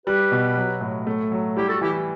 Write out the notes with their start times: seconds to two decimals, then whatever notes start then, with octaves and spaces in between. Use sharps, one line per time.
0.06 G3 G4 B4
0.32 B2
0.57 F#3
0.81 A2
1.07 A3
1.32 F#3
1.56 G3 E4 G4
1.68 F#4 A4
1.81 E3 E4 G4